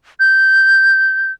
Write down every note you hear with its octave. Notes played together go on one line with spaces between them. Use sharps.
G6